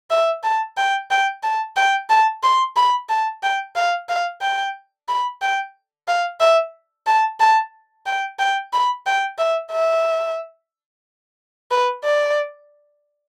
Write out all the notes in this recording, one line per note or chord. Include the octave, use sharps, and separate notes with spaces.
E5
A5
G5
G5
A5
G5
A5
C6
B5
A5
G5
F5
F5
G5
B5
G5
F5
E5
A5
A5
G5
G5
B5
G5
E5
E5
B4
D5